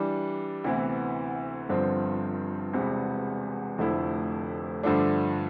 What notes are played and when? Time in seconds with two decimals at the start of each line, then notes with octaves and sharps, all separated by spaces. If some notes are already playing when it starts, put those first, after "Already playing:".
Already playing: E3 G3 D4
0.64 D2 C3 E3 B3 E4
1.69 G1 G2 D3 F3 C4
2.73 E1 E2 C3 G3 B3
3.78 F1 F2 D3 A3 E4
4.83 G2 D3 F3 A3 D4